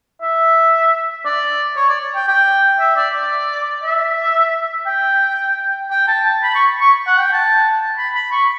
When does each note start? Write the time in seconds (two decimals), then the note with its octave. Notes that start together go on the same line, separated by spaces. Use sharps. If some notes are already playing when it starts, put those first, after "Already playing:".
0.22 E5
1.25 D5
1.77 C#5
1.89 D5
2.16 G5
2.28 G5
2.80 E5
2.97 D5
3.14 D5
3.84 E5
4.86 G5
5.91 G5
6.08 A5
6.25 A5
6.43 B5
6.55 C#6
6.81 C#6
7.07 F#5
7.19 G5
7.33 A5
7.97 B5
8.15 B5
8.32 C#6